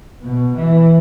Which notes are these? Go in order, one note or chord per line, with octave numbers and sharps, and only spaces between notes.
B2
E3